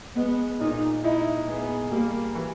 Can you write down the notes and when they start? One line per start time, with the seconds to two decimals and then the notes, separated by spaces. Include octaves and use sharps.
0.16 G#3 B3
0.60 A#2 D#4
1.04 D#4 E4
1.48 B3 G#4
1.92 G3 A#3
2.35 E3